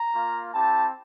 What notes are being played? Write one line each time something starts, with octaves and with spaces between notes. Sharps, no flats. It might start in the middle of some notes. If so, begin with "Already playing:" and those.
Already playing: A#5
A#3 F4
C4 E4 G4 A5